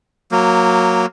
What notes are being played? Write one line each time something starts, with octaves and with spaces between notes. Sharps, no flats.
F#3 A#3